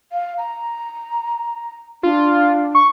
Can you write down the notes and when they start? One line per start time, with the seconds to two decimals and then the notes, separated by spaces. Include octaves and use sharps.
0.12 F5
0.38 A#5
2.03 D4 F4
2.75 C#6